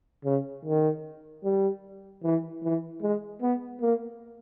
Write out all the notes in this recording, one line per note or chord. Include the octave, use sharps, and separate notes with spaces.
C#3
D#3
G3
E3
E3
G#3
B3
A#3